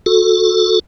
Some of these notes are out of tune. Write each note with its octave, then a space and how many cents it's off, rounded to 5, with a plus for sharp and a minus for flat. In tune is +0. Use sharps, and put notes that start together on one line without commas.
F#4 -25 A4 +0